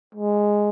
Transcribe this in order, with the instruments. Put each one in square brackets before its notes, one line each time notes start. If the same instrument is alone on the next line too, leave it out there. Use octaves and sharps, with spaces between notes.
[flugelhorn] G#3